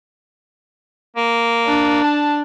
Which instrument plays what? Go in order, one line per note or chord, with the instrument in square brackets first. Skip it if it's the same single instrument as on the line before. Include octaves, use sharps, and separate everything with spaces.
[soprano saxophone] A#3
[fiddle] D4
[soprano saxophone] A5